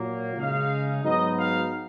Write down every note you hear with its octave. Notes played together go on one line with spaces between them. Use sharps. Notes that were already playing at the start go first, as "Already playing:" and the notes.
Already playing: A#2 F#3 A#3
C#3 G#3 D#4 F5
G#2 F#3 B3 D#4 D#5
F5